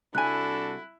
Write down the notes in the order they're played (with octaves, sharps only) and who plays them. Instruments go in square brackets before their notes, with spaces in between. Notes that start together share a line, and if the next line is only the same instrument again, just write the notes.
[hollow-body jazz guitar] C2 G#5 [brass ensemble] D4 F#4 A4 [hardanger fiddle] E4 [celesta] F#6